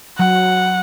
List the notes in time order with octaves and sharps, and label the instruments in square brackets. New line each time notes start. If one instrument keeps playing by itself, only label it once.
[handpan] F#3 [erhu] F#5